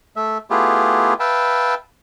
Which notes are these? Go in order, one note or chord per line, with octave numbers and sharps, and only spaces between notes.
A3 E5
A3 B3 E4 F4 G4 G#4
B4 E5 F5 G5 A5